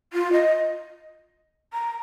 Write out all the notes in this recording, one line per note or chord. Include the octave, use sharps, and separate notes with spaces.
F4
D#5
A#5